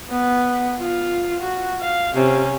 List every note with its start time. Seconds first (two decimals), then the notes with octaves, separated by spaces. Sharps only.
0.10 B3
0.78 F4
1.40 F#4
1.81 F5
2.15 C3 C#4